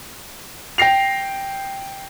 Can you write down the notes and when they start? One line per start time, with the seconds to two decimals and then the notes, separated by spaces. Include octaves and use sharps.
0.78 G5 A#6 C7 F7